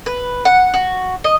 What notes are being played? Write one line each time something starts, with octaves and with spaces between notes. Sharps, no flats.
B4
F#5
F#4
D#5